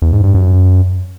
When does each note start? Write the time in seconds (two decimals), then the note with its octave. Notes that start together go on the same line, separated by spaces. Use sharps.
0.02 E2
0.13 G#2
0.24 G2
0.35 F#2